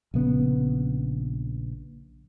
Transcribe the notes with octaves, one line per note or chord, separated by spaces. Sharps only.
A#1 C#3 B3